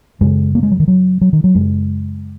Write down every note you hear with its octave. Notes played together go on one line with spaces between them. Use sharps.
F#2 C#3 G#3
A#3
G#3
F#3
D#3
F#3
F#3
D#3
F#3
F#2 C#3 G#3